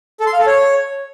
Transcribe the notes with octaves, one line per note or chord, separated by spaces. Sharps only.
A4
C6
F5
A4
C#5